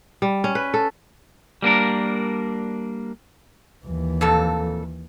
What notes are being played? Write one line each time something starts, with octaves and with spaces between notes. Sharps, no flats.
G3
C#4
B4
A4
G3 A#3 D4 A#4
D#2 E3
F2 A#2 A4